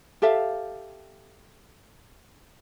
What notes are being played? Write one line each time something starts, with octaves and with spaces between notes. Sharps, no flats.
G4 A4 E5 F5